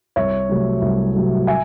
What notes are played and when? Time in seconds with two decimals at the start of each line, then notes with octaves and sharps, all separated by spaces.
0.16 C2 C#5 E5
0.49 C3 F#3 A3
0.82 C2
1.14 C3 F#3 A3
1.47 E5 G#5